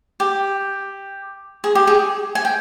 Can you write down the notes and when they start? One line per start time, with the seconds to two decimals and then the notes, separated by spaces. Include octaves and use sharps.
0.20 G4
1.64 G#4
1.75 G4
1.87 G#4
2.35 G#5
2.45 G5